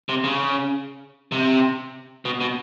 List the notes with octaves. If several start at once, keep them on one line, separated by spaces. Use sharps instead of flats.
C3
C#3
C3
B2
B2